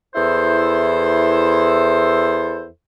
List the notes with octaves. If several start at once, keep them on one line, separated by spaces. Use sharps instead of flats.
E2 E4 A4 C5